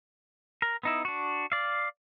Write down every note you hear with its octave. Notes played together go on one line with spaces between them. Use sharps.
A#4
B3 D#4 E4
D4 F#4
D5 F5